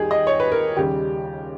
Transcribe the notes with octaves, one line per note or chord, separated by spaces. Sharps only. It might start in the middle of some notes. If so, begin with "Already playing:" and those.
Already playing: D#2 D#3 G3 G4 G#4
D#5
C#5
B4
A#4
D#2 C#3 G3 G4